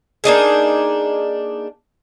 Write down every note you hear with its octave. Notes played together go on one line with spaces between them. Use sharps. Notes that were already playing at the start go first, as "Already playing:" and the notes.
A#3 D4 D#4 G#4